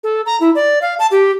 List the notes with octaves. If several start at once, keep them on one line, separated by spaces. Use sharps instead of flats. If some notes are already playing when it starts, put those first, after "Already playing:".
A4
A#5
E4
D5
F5
A5
G4